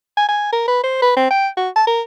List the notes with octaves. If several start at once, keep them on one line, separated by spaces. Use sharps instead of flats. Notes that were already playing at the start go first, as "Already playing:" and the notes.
G#5
G#5
A#4
B4
C5
B4
C4
G5
F#4
A5
A#4